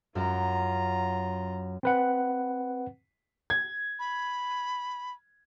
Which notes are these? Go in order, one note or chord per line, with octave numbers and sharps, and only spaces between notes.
F#2 F4 A#5
C4 B4 F#5
G#6
B5